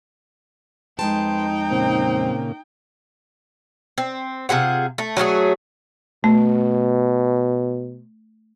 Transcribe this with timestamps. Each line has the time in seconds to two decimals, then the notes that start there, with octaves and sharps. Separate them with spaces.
0.99 F2 G#3 D#4 B4 G5 A5 C6
1.71 A#2 C#3 A#3 C4
3.98 C4
4.49 C3 F4 G#4 F#5
4.98 A3
5.17 F#3 A3 F4 G#4
6.24 B2 A3